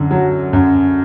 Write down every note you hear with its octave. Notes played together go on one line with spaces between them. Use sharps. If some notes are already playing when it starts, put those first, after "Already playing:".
Already playing: F#2 D3
F#3
F#2